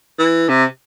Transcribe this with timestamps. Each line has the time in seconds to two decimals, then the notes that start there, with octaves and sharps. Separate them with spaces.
0.19 E3
0.49 C3